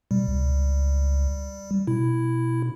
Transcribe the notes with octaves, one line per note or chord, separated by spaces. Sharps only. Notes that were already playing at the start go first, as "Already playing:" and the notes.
B2 G3
C#2
B2 E4